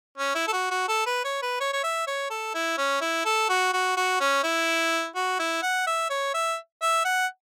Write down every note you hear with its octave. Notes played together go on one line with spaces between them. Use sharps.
C#4
E4
A4
F#4
F#4
A4
B4
C#5
B4
C#5
C#5
E5
C#5
A4
E4
C#4
E4
A4
F#4
F#4
F#4
C#4
E4
F#4
E4
F#5
E5
C#5
E5
E5
F#5